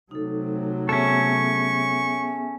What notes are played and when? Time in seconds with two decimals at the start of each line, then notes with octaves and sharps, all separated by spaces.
0.11 C3 F#3 A3 D#4 A4
0.89 B3 C#4 G#4 A4 E5 C#6